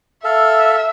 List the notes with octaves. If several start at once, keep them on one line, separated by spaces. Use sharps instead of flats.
A4 E5 F5